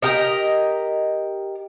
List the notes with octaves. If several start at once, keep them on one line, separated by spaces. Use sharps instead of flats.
G4 A#4 D#5